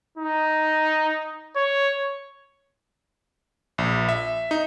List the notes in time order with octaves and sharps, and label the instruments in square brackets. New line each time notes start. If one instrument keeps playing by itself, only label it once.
[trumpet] D#4
C#5
[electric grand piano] A#1
E5
D#4